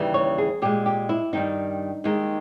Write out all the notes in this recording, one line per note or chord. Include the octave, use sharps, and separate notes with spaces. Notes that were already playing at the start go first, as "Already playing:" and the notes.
Already playing: D#2 C#3 E3 G3
C#5
G#4
A#2 G#3 G4
G4
E4
G2 D#3 G3 D#4
D#2 D#3 G#3